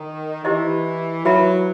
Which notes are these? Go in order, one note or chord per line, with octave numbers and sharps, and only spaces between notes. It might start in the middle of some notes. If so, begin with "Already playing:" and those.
Already playing: D#3
E3 E4 G4 C5 D#5
F#3 E4 B4 E5 B5